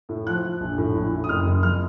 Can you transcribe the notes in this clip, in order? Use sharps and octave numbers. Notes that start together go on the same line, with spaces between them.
A2
F3 F#6
F3
A#1
A2
A#1
A2
D#6
F#1 F6
F#1
F2 F6